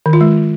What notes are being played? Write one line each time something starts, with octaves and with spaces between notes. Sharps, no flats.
D#3
F4
G#3